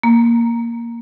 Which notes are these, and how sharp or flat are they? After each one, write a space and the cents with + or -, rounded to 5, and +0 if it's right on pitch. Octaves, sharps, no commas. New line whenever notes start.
A#3 +0